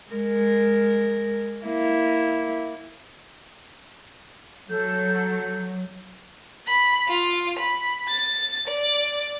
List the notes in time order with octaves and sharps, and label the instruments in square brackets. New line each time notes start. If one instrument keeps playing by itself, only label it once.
[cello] G#3 A#4
A#3 E4
[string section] F#3 [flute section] A4 G6
[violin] B5
F4
B5
A6
D5